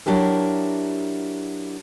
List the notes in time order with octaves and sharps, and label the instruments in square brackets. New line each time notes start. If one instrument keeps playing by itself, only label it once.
[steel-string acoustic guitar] F#3 D4 E4 G4 A#4